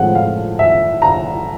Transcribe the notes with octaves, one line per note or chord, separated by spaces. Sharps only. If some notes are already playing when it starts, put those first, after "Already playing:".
Already playing: A2 F3 G#3 C4 F#5
F5
E5
A#5